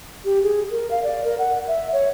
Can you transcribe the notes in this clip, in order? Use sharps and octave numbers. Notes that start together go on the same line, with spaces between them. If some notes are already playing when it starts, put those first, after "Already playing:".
G4
G#4
A#4
F5
D5
A#4
F#5
E5
C#5